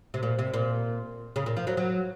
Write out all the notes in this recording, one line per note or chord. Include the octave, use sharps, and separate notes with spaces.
C3
A#2
C3
A#2
C#3
A#2
F3
F#3
F#3